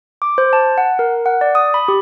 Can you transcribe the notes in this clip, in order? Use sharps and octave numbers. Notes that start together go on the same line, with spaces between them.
D6
C5
A5
F#5
A#4
F#5
D5
D#6
B5
G4